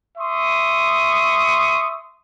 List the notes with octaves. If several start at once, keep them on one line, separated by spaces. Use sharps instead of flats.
E5 C6 C#6 D#6